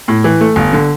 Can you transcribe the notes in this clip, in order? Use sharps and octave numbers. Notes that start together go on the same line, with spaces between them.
A2
E3
A3
G1
D3